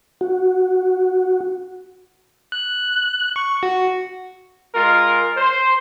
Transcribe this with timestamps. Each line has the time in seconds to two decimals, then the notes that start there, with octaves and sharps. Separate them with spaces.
0.21 F#4
2.52 F#6
3.36 C#6
3.63 F#4
4.74 G#3 F4 A#4
5.37 C5